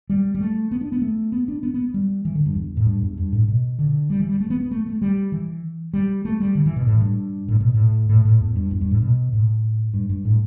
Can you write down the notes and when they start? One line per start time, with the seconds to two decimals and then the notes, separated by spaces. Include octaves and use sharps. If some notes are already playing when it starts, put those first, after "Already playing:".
0.10 G3
0.35 G3
0.40 A3
0.71 B3
0.81 D4
0.92 B3
1.02 A3
1.32 B3
1.48 D4
1.63 B3
1.74 B3
1.94 G3
2.25 E3
2.35 D3
2.46 G2
2.55 E2
2.77 A2
2.86 G2
3.02 E2
3.18 G2
3.32 A2
3.48 B2
3.79 D3
4.10 G3
4.20 E3
4.29 G3
4.40 A3
4.50 B3
4.61 B3
4.71 A3
4.87 A3
5.02 G3
5.32 E3
5.94 G3
6.25 A3
6.40 G3
6.55 D3
6.66 E3
6.76 B2
6.87 A2
7.01 G2
7.48 A2
7.61 B2
7.74 A2
8.09 A2
8.25 A2
8.41 E2
8.56 G2
8.71 E2
8.81 G2
8.91 A2
9.02 B2
9.33 A2
9.94 G2
10.10 G2
10.25 A2